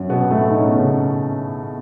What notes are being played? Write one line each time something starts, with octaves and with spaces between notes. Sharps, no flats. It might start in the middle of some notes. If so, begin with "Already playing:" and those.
Already playing: F#2 F#3
B2 B3
A2 A3
D#4
C#4
B3
C#3 C#4